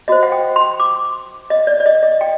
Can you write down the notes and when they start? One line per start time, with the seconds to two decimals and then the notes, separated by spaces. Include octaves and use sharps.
0.08 F#4 C5 D#5
0.23 F#5
0.32 G5
0.56 C6
0.80 D6
1.50 D#5
1.67 D5
1.80 D5
1.86 D#5
2.03 D#5
2.21 G5